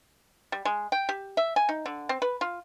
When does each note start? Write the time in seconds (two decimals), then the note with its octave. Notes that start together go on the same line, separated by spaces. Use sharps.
0.52 G3
0.65 G#3
0.92 G5
1.09 G4
1.37 E5
1.56 G#5
1.69 D#4
1.86 D3
2.09 C4
2.22 B4
2.41 F4